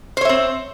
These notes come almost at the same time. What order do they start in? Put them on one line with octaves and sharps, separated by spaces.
C5 C#5 E5 C4